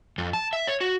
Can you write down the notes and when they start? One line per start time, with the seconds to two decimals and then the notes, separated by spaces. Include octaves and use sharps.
0.18 F2
0.33 A5
0.53 E5
0.68 C#5
0.81 F#4